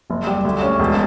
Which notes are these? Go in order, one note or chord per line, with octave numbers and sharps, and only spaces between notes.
F#1
G3
D2
C#4
E1